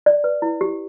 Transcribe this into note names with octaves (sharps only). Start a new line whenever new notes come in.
D5
B4
E4
G4